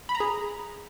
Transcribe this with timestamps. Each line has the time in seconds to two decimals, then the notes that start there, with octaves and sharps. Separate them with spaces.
0.09 B5
0.15 A#5
0.20 G#4